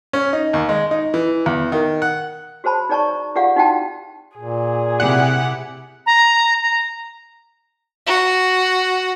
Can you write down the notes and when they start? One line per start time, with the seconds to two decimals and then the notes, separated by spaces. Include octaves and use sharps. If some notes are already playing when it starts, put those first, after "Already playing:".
0.13 C#4
0.33 D#4
0.53 D#2
0.69 G#3
0.91 D#4
1.14 E3
1.46 E2
1.72 D#3
2.02 F#5
2.64 F#4 G#4 C5 A5 B5
2.89 D#4 G#4 D5 A5 A#5 C#6
3.35 F4 G4 G#4 D5 F5 F#5
3.56 D#4 E4 F#4 F#5 G5 A5
4.37 A#2 G#4
5.00 C3 E4 G4 F#5
6.06 A#5
6.62 A#5
8.07 F#4